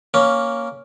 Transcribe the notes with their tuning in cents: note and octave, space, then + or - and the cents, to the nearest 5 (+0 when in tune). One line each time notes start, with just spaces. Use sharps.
A#3 +0 C#4 +0